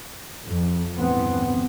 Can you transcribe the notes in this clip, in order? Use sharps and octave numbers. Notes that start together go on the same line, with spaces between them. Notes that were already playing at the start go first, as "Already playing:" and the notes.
F2
G1 E2 A2 E3 B3 C4